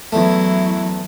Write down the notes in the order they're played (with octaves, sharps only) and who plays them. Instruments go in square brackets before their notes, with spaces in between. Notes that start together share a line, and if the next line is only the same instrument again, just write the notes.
[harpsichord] E2 A3 [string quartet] F#3 E4